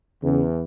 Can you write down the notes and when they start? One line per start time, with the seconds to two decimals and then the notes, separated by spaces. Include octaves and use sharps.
0.22 E2 C#3